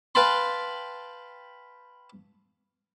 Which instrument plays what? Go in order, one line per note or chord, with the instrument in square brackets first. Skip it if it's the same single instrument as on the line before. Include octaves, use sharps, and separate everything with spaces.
[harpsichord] B4 F5 G5 A5 B5 C6